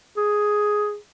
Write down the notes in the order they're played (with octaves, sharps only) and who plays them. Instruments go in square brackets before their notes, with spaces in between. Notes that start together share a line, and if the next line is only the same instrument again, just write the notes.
[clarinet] G#4